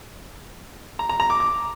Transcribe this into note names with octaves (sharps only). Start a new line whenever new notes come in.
A#5
A#5
A#5
D6
D6